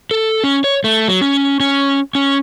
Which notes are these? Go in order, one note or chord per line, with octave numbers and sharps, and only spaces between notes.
A4
C#4
C#5
A3
F#3
C#4
C#4
C#4